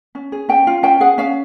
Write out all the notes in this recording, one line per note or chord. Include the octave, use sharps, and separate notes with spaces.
C#4
G#4
C#4 G5
F4
C#4 G5
G#4 F#5
C#4 F5